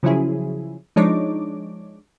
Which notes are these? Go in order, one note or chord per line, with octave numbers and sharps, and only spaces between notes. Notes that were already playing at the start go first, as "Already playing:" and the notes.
C#3 F3 F#3 C#4 E4 G#4
F3 G#3 D4 D#4 C#5 D6